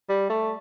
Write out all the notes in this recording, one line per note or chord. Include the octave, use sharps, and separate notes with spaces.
G3
A3